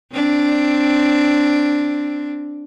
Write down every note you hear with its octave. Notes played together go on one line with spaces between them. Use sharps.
C4 D4